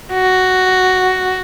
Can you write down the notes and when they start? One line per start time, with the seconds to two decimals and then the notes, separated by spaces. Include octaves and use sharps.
0.14 F#4